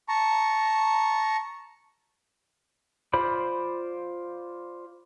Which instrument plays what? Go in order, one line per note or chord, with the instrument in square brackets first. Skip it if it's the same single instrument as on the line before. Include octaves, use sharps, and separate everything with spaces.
[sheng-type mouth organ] A5 A#5 C#6
[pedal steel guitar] F4 C5 D5 B5